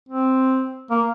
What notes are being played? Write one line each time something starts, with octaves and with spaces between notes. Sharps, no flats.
C4
A#3